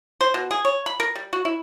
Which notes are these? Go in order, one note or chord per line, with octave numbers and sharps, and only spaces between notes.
C5
B2
G#4
C#5
B5
A#4
G3
F#4
E4